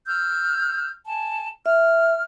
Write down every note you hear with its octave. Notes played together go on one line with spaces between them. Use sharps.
E6 F6 G6
G#5 A5
E5 F6